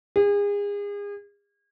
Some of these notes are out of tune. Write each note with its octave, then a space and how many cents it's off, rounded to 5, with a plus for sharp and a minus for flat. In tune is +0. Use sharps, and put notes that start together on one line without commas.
G#4 -35